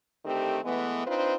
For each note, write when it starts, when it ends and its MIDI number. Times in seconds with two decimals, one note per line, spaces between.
0.25 0.58 50
0.25 0.58 51
0.25 0.58 57
0.25 0.58 60
0.25 0.58 67
0.64 1.05 52
0.64 1.05 56
0.64 1.05 57
0.64 1.05 59
1.06 1.34 60
1.06 1.34 62
1.06 1.34 63
1.06 1.34 65
1.06 1.34 71
1.06 1.34 72